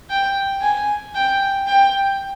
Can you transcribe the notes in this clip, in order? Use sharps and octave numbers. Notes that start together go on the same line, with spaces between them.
G5
G#5
G5
G5